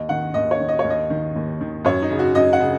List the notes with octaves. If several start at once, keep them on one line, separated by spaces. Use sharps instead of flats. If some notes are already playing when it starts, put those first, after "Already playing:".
Already playing: D#2 D#5
D#3 F#5
D#2 D#5
C#5
D#3
D#5
D#2 C#5
D#5
D#3
D#2
D#3
F#2 C#5
D#4
C#3
F#4
F#2 D#5
F#5
C#3